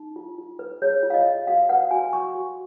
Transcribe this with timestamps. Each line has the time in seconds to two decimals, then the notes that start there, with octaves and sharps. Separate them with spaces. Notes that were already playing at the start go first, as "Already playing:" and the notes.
Already playing: D#4
0.16 F4
0.38 F4
0.59 B4
0.82 G#4 C#5
1.03 F4
1.10 F5
1.14 D#5
1.26 F4
1.47 F#4 F5
1.69 B4 F#5
1.91 F#4 G#5
2.13 B4 C#6
2.35 F#4